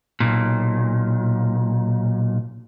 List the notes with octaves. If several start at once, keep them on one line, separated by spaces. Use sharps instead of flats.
B1 A#2